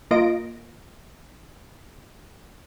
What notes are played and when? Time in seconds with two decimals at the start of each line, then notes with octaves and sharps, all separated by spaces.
0.11 A#3 F4 D#5 A#6 D7